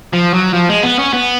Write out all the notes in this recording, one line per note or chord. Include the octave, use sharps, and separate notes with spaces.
F3
F#3
F3
G#3
B3
C#4
B3